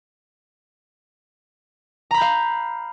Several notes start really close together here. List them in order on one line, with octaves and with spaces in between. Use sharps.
A#5 B5 G6 F5